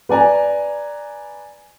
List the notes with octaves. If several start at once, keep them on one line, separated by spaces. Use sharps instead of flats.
B4 D5 G#5 A#5